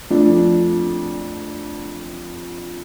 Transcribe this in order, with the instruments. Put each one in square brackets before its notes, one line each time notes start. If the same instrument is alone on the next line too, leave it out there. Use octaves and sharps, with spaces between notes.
[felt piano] F2 F3 A3 D4